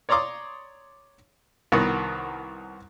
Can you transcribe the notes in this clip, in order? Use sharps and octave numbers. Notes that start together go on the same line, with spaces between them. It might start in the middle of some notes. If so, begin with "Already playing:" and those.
C#5 D5 A#5 C6 D6 D#6
C2 D#3 B3 F#4 C#6 D#6